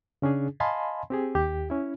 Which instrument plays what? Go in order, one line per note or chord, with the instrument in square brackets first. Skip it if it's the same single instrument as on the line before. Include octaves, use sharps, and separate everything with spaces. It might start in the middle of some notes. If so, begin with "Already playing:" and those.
[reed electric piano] C#3 C#4 D4 G#4
D#5 F5 G#5 A5 B5 C6
C4 G4 G#4
D#2 G4
C#4 E4